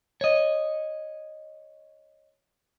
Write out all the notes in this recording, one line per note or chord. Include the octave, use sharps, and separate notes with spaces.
C#5 D#5